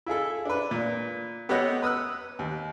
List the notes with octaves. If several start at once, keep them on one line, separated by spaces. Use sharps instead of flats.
E4 F4 G#4 A4
D4 B4
A#2
B3 G4 A4 C#5 D#5 F#5
B4 D#6 E6 F#6
D#2